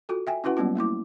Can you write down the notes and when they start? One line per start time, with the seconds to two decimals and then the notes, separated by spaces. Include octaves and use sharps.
0.09 F4 F#4 A4
0.27 E5 G5 G#5
0.44 C#4 E4 F#4 B4 F#5
0.57 F#3 G3 A#3 B3 C#4 F4
0.75 A3 A#3 E4 D6